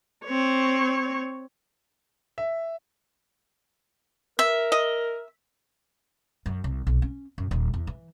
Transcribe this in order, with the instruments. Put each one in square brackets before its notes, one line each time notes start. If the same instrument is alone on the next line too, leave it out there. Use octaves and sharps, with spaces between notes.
[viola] C4 C#5
[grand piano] E5
[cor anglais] A#4 [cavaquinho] E5
[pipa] D#5
[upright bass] F#2
C2
B1
C#4
F#2
D#1
E2
E3